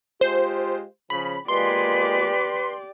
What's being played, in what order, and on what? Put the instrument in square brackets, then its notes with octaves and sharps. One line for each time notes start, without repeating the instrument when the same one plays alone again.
[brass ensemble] G#3 F4 G4 [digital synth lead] C5
[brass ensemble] C#3 F3 [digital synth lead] B5
[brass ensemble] G#3 A#3 F4 [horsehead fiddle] G4 D5 [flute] B4 [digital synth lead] C6